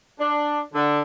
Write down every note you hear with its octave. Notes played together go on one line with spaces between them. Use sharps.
D4
D3